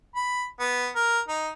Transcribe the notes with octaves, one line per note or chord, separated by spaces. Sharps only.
B5
B3
A#4
D#4